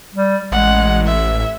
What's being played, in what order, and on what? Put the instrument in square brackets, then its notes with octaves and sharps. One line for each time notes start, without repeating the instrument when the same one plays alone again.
[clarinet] G3
[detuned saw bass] A1 [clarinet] G#3 [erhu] F#5
[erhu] E5